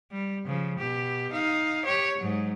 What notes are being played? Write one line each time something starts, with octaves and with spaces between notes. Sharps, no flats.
G3
C#3 F3
B2 G4
D#4 F5
G4 C#5
G#2 F#3